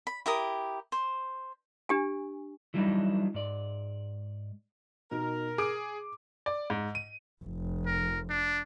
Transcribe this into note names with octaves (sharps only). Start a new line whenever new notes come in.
B5
E4 G4 A#4 D#6
C5
D4 G4 G#5
E3 F#3 G3 C4 D4 D#4
G#2 D5
B2 D#4 A#4
G#4 D6 D7
D5
G#2
D#7
F1
A#4
D4